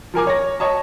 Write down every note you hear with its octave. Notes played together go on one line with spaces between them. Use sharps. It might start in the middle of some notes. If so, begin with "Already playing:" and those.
F3 A#4 G#5 D6
C#5 A#6
C#5 D#5 A5